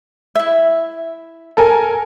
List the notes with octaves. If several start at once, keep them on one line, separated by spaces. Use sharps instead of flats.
E4 E5
A4 A#4 G#5